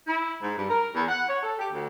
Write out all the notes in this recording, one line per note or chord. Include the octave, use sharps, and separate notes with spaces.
E4
G#2
G2
A#4
E2
F#5
C#5
A4
G4
D2